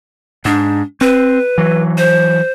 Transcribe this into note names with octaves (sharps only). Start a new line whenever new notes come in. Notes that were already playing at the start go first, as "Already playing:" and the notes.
G#2 D4
C4 B4
E3 F#3
C5